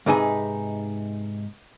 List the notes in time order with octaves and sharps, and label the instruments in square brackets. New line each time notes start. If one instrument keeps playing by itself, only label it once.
[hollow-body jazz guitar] G#2 C3 D#4 G#4 B4 G#5